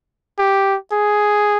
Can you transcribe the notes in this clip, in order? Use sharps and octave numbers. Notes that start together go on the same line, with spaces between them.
G4
G#4